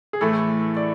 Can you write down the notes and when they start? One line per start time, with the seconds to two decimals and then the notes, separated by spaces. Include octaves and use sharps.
0.13 G#4
0.21 A2 E3 A3 A4
0.77 D5